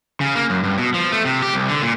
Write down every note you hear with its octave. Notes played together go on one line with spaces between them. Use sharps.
C#3
A#3
F#2
G2
B2
F3
A3
C3
G4
C2
D3
A#2